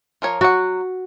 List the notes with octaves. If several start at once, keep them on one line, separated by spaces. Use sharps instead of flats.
F3 A#4 C#5
F#3 F#4 F#5